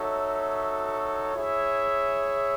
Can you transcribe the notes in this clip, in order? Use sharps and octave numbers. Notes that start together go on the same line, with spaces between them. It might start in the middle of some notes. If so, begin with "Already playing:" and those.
Already playing: D#4 F#4 A4 C#5 E5
E4 G#4 C#5 E5